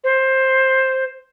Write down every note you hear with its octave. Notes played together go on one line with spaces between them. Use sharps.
C5